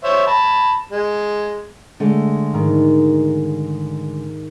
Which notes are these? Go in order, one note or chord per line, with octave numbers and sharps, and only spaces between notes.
C5 C#5 E5
A5 B5
G#3
D3 G#3 A3
G#2 D#3